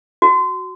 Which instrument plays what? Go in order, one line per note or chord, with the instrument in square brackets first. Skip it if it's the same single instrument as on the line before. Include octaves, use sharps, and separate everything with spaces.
[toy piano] F#4